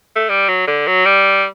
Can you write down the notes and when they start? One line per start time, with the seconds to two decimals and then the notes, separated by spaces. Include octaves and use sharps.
0.16 A3
0.29 G3
0.48 F#3
0.67 D3
0.87 F#3
1.05 G3